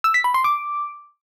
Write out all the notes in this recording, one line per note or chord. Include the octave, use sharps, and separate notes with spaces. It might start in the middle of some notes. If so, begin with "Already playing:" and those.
E6
B6
B5
C6
D6